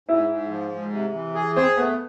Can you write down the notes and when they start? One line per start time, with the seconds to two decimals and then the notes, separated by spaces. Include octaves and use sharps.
0.09 G#2 E4
0.29 G#2
0.50 F3
0.72 G#2
0.92 C3
1.13 E3
1.35 G#4
1.56 C4 G#4
1.77 A3 B3